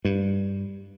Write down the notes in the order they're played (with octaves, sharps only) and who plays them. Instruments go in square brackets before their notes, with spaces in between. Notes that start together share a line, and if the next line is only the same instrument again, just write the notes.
[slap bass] G2